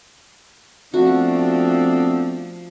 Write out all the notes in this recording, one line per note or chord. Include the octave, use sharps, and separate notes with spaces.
F3 A3 B3 C4 D4 F#4